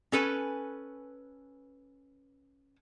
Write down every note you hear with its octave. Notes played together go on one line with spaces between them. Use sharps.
C#4 A4 B4 G#5